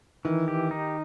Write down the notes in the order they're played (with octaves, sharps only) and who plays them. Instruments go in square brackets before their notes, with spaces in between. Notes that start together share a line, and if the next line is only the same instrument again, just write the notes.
[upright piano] D#3 [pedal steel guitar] E3
[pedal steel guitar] G4
D#4